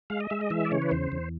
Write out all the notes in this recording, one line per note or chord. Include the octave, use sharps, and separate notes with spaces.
G#3 F5
D#5
G#3 E5
D#5
E3 E5
D5
C#3 C#5
B4
E2 C5
E2